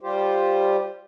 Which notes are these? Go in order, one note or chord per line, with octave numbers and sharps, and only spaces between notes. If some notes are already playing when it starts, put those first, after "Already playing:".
G3 F4 G4 C5